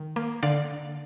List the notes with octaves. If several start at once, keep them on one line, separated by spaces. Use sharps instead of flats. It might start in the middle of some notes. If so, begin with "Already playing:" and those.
Already playing: D#3
A#3
D3 D5 F5